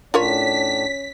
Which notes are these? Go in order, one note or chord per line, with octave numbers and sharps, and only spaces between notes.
A2 C#4 D4 F4 A#4 C#5 B6